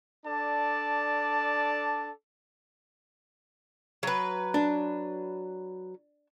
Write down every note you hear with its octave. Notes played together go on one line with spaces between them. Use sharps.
D4 A4 D5 A5
F#3 B4
D4